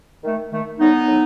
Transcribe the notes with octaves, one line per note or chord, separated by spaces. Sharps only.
D#3 A3
D#3 A3
A2 G3 B3 D#4
A2 F#3